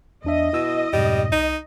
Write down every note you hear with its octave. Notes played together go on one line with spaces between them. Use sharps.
E2 D4 D#5 E5
B2 E4 E6
F2 G#2 B2 G3
C2 D#4